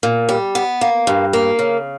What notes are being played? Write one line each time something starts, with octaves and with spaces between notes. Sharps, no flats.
A#2
G3
B3
A#3
G2
A#3
C#3